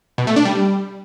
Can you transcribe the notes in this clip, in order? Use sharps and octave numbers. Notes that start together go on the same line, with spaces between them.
B2
A3
D4
G3